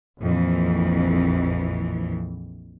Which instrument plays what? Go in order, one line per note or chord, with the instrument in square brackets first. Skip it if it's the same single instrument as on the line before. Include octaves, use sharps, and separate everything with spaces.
[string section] A#1 F2 E3